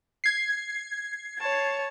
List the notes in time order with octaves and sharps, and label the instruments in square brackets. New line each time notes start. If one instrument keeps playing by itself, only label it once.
[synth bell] G#6 C7
[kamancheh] C#5 A5